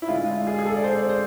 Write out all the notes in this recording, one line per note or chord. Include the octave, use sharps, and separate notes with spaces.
E4
D3 G#3 D4 F4
F4
G#4
G#4
A4
D5
C5
C5